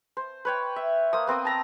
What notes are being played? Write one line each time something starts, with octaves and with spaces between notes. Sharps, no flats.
C5
B4 C#5 G5
E5
A#3 C5 D#6
B3 C4 G5 D#6
A5 A#5 E6